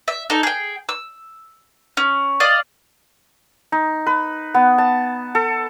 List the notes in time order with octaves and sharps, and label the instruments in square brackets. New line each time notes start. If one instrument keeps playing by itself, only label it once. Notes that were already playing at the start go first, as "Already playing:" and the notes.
[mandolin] E5
D#4 A4
G#4 G5
E6
C#4
D5 D#5 F5
[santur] D#4
B4
B3
A5
A4